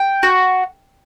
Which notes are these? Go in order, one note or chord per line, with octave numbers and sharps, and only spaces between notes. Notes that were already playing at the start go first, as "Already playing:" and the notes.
Already playing: G5
F#4